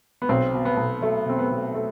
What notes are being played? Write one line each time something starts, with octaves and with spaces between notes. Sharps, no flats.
B3
B1 C4
B2
B3
B1
F#3 A3
B2 C4
B3
B2
A3